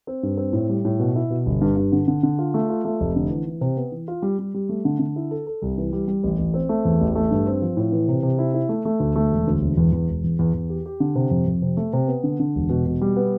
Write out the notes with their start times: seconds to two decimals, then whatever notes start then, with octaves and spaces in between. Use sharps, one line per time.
0.07 C4
0.23 G2
0.37 C4
0.53 A2
0.69 G3
0.85 A2
0.99 B2
1.16 E4
1.30 B2
1.46 G1
1.61 G2
1.77 G2
1.92 D3
2.08 D3
2.23 D3
2.39 F4
2.54 A3
2.69 F4
2.85 A3
3.00 F1
3.16 D3
3.30 E3
3.46 E3
3.61 C3
3.77 B3
3.92 E3
4.08 F4
4.22 G3
4.39 G3
4.54 G3
4.69 A3
4.85 D3
4.99 D3
5.16 E4
5.31 A4
5.47 A4
5.62 C2
5.78 E3
5.93 G3
6.08 G3
6.24 A1
6.39 A1
6.54 C4
6.69 A3
6.85 E2
7.01 A1
7.15 A3
7.31 G2
7.47 C4
7.62 F3
7.77 A2
7.92 E3
8.08 C3
8.23 C3
8.38 E4
8.54 E4
8.69 A3
8.85 A3
9.00 D2
9.16 A3
9.31 E1
9.47 D2
9.61 E1
9.77 E2
9.92 E2
10.09 E1
10.24 E2
10.39 E2
10.54 E2
10.70 G4
10.86 G4
11.00 D3
11.15 C3
11.31 F2
11.46 F2
11.62 C3
11.77 A3
11.93 C3
12.08 B3
12.24 D3
12.40 D3
12.55 E1
12.69 B2
12.86 B2
13.01 G3
13.16 B3